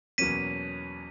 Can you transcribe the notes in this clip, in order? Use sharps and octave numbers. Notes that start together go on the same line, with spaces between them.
E2 B2 F#3 A#3 C#4 B6 D#7